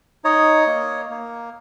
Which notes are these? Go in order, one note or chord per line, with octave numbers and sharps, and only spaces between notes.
D#4 C#5 D#5
A#3
A#3